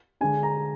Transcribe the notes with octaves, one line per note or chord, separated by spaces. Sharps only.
D3 G#3 D4 G#5
A#5